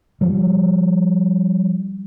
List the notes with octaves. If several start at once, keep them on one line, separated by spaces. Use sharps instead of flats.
F3 G3